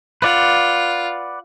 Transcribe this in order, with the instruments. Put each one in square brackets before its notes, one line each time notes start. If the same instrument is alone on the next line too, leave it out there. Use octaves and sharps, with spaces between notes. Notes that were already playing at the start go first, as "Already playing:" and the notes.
[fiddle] F4 [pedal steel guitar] B4 D5 F#5